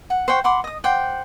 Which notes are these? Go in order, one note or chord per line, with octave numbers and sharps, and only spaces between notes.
F#5
C5 F#5 G5 C#6
F#5 B5 C6 D6
D#5 D#6
C5 F#5 G5 D6